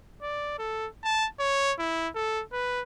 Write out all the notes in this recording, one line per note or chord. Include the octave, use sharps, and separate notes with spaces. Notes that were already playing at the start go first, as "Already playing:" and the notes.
D5
A4
A5
C#5
E4
A4
B4